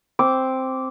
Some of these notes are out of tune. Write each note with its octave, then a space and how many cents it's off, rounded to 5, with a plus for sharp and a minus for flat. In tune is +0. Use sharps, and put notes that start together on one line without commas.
C4 +0 D6 -10